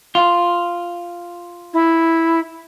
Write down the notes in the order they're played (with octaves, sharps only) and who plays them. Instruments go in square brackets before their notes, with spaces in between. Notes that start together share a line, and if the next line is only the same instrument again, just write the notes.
[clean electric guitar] F4
[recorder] E4